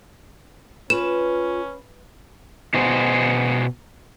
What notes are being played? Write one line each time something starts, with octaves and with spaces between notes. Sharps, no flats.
C#4 F4 B4 E7
B2 F#4 G#4 C5